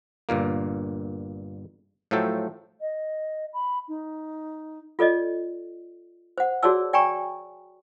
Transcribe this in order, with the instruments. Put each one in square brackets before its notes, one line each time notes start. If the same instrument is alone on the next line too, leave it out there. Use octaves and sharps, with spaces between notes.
[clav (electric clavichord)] G1 G2 A#2 A#3
A2 F3 F#3 A3 A4 G5
[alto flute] D#5
B5
D#4
[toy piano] F4 A4 D5 D#5
C5 F#5
F#4 G#4 C#5 D5 A5 E6
D5 G5 G#5 A#5 C#6